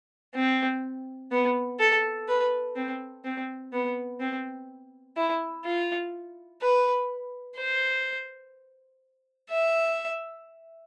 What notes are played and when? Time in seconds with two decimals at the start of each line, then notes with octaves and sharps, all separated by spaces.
0.35 C4
1.32 B3
1.79 A4
2.28 B4
2.76 C4
3.25 C4
3.73 B3
4.20 C4
5.17 E4
5.65 F4
6.62 B4
7.57 C5
9.50 E5